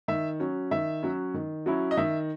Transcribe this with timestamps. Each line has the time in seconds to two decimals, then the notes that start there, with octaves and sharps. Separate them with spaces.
0.08 D#3 E5
0.40 F#3 C#4
0.71 D#3 E5
1.03 F#3 C#4
1.34 D#3
1.66 F#3 C#4 E4
1.91 D#5
1.97 D#3 E5